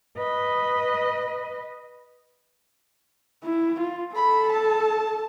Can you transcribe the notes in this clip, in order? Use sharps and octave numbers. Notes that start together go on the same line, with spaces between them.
B4 D#5
E4
F4
A4 B5
A5